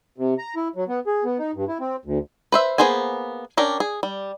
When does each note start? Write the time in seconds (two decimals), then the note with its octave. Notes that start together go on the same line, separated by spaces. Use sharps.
0.18 C3
0.38 A#5
0.56 E4
0.76 F#3
0.88 B3
1.07 G#4
1.24 B3
1.39 D#4
1.55 G2
1.68 E4
1.80 C4
2.05 D2
2.52 B4 C5 E5
2.78 A#3 B3 G#4 C5 G#5
3.57 C#4 D4 A#4 G5
3.80 G#4
4.03 G3